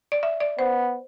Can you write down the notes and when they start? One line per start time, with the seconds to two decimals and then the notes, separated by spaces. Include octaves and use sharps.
0.12 D5
0.23 E5
0.40 D5
0.59 B3 C5